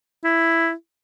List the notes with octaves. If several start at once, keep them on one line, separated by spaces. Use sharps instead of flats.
E4